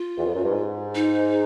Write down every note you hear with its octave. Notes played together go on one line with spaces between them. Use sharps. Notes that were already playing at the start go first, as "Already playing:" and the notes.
Already playing: F4
E2
F2
F#2
G2
G#2
D#4